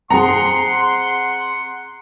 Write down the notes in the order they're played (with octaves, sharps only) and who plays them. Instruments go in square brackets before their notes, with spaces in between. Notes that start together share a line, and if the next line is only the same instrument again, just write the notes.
[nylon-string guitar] C4 G#4 [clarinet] F#5 [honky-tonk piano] A#5 [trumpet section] C6